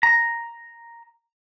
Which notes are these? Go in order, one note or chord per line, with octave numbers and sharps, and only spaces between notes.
A#5